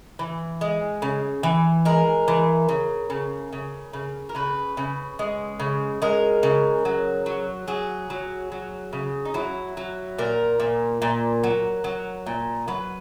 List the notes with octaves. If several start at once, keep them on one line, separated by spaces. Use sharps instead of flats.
E3
G#3
C#3
E3
G#3 A#4
E3
C#3
C#3
C#3
C#3
A#4
C#3 B4
C#3
G#3
C#3
G#3 A#4
C#3
F#3
F#3
F#3 G#4
F#3
F#3
C#3
D#4
F#3 E4
F#3
A#2 A#4
A#2
A#2
F#3
F#3
A#2
F#3 B4